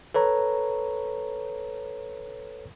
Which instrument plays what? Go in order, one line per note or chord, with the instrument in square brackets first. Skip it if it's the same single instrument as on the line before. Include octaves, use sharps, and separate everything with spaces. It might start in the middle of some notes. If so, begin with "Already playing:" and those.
[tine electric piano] A4 B4 C#5 A#5